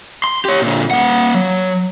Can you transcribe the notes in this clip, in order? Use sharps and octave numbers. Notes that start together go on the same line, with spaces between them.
C6
G4 C#5
A#2 D3
A#3 F#5
F#3